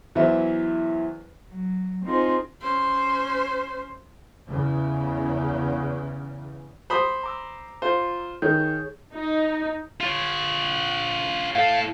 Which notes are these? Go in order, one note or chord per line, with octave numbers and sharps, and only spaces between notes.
E2 E3 F#3 C5 E5
F#3
C4 D#4 F4 G#4 C5
C#4 C5
E2 C#3
C5 B5 D#6
A#5 D6 E6
F4 C5
D#3 G#4 C#5 G6
D#4
F4 C#5
A2 A4 F5